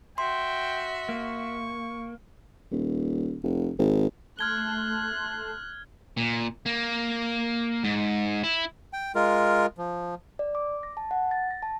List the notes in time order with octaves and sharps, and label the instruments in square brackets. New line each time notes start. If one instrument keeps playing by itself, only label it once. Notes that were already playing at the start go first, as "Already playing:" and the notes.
[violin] F#4 E5 [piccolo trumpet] G5 [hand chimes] C6
[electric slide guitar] A#3 [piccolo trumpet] C#6
[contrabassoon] D#1
F1
G#1
[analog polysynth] A3 A5 C6 [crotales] F6 G#6 G7 [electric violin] F#6
[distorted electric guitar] A#2
A#3
G#2
E4
[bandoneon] G5
G#3 F4 A#4
F3
[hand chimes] D5
D6
A#6
A5
F#5
A6
A#6
A5